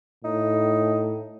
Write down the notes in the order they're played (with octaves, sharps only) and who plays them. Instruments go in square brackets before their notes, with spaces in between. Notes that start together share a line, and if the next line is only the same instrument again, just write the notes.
[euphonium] A2 [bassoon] D#4